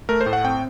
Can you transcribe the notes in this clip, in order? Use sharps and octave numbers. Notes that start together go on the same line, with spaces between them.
A3 A#4
C5
A2
F#5
C4 G5